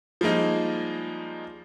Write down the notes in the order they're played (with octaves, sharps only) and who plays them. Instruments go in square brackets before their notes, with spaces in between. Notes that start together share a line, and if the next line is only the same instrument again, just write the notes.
[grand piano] F3 G3 G#3 A#3 D#4